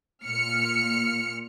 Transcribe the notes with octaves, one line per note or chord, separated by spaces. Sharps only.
A#2 F6 C#7